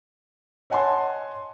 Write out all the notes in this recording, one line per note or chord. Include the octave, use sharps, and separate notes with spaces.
C#5 D#5 F#5 G#5 A5 C6